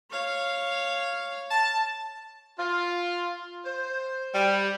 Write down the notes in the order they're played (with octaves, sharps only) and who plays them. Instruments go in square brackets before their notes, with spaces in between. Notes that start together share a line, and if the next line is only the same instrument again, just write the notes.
[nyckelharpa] C#5 F5
[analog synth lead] A5
[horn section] F4
C5
G3